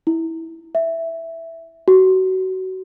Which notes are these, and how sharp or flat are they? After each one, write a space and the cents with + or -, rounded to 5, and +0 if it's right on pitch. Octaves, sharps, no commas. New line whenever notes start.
E4 -15
E5 +0
F#4 +25